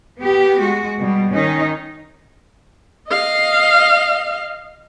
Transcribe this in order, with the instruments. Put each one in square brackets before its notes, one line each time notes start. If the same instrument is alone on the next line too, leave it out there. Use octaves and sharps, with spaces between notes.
[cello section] B3 G4
G#3 F#4
B2 G3
D#3 C#4 D#4
[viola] D#5 F5